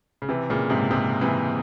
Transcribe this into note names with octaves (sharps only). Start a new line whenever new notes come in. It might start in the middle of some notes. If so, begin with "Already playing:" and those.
C#3
C3 E3
A#2 C#3
G#2 C3
G#2 C3
C3 E3